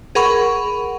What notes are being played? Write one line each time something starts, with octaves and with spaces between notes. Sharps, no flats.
G#4 A#4 F#5 B5 C#6